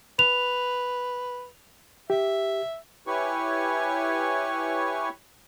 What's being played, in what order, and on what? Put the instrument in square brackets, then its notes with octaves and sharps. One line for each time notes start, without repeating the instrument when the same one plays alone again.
[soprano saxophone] B4 [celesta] F7
[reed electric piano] G4 [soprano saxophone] E5
[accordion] E4 G4 B4 C#5 G#5 C#6